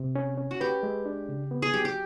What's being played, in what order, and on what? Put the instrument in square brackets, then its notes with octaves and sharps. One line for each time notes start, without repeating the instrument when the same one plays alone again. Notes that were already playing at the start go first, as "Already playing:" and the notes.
Already playing: [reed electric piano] C3
C#4
C#4
[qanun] F#4
[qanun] G4 [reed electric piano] B4
[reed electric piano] G#3
D4
C#3
B3
[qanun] G#4
[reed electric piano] F#3 [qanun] G4
[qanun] G4